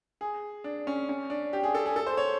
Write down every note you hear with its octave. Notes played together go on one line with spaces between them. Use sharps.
G#4
D4
C#4
C#4
D4
G4
G#4
A4
G#4
A4
C5
C#5